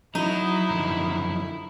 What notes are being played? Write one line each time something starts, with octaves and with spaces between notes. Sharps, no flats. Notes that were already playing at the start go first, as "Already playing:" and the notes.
F#3 D#4 E4
F#2 D3 F3